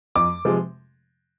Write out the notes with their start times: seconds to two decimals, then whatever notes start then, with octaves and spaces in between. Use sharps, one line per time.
0.16 F2 D6
0.45 C3 F3 G#3